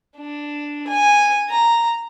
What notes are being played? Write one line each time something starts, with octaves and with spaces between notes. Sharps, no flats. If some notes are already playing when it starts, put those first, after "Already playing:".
D4
G#5
A#5